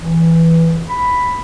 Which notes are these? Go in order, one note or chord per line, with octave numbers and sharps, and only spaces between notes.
E3
B5